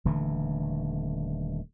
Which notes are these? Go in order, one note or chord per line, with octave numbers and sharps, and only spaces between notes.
D#1 D3 E3 A3